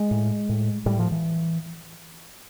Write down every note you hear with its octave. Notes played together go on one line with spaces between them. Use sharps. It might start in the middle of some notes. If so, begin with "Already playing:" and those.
Already playing: G#3
A2
A2
A2 G3
F3
E3